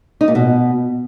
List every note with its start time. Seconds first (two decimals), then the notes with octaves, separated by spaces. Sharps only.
0.21 D#4
0.28 A#2
0.35 B2